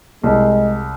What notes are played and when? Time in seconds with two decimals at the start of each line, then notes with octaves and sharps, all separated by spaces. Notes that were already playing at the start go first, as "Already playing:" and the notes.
0.23 C2 G#3